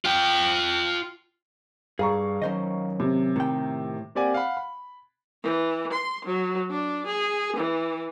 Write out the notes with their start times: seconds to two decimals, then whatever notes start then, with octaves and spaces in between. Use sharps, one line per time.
0.05 F4 G5
1.99 G2 G#4 F5 A#5 C#6
2.42 D#3 F#3 C#4 C5 D#5
3.00 C3
3.36 A2 D#3 G5
4.15 A#3 C4 G4 D5 F#5 G#5
4.34 F5 F#5 B5
4.57 B5
5.43 E3
5.93 C6
6.25 F#3
6.71 D4
7.06 G#4
7.57 E3